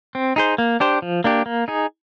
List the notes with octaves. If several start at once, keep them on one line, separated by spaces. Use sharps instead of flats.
C4
D#4 G#4 C5
A#3
D4 G4 C5
F3
A#3 D4 G4
A#3
D#4 G#4